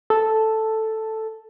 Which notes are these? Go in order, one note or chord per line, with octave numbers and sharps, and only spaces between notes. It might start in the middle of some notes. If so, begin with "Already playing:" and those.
A4